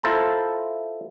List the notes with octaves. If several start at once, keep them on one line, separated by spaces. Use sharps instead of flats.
E4 F4 A4 C5 A5 A#5